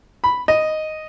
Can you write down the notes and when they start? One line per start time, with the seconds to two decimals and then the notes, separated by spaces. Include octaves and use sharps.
0.24 B5
0.48 D#5